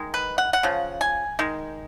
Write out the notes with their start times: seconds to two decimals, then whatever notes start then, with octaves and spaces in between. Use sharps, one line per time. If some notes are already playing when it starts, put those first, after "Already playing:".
Already playing: D#3 G#3
0.14 B4
0.38 F#5
0.53 F#5
0.63 C#3 F3
1.01 G#5
1.39 D#3 G#3